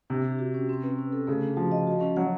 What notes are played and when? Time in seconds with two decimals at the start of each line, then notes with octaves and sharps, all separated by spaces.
0.10 C3 D4
0.25 G4
0.39 F#4
0.54 C#4
0.69 C4
0.83 B4
0.98 C#4
1.12 A4
1.27 C#3 A3
1.43 D4
1.57 F3 F#4
1.71 D#5
1.87 F#4
2.01 C#4
2.16 F#3 F#5